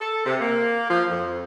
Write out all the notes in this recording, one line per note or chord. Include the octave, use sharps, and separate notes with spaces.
A4
C3
A#3
F3
F2